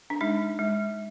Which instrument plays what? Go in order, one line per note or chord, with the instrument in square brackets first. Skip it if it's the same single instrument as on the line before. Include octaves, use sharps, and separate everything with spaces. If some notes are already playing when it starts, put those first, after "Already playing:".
[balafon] D4
G#3 D#4
G#3